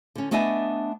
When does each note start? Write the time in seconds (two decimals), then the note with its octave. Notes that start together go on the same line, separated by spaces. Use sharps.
0.15 D3 C#4
0.31 A3 B3 D4 D#5 E5 G#5